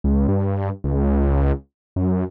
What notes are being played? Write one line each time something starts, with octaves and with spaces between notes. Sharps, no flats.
C#2
G2
C#2
F#2